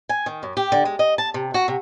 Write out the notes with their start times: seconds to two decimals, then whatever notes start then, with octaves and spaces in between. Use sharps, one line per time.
0.09 G#5
0.26 D#3
0.43 F#2
0.57 G4
0.72 D3
0.85 G#3
0.99 D#5
1.18 A5
1.34 C3
1.54 F#4
1.68 C3